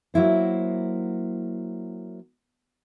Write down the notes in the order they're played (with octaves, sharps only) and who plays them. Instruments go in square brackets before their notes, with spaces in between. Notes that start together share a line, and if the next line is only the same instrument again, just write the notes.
[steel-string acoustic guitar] F#3 A#3 E4 C5